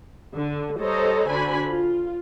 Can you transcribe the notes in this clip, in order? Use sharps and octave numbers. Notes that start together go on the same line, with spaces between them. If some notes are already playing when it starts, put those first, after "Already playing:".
D3
G3 A4 C5 C#5 D#5 A#5
D3 D4 F#4 C5 G#5 B5
F4